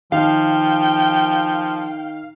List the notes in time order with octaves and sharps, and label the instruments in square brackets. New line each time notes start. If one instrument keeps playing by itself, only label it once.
[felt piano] D#3 [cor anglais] F3 [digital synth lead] F5 [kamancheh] G5